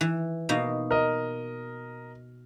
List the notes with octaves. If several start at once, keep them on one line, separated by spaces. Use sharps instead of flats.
E3
B2 A#3 D#4
A#4 D#5